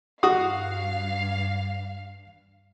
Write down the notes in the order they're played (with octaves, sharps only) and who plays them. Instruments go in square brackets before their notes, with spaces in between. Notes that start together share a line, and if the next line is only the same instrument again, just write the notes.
[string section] G2 F5 [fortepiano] F#4 F#5 D#6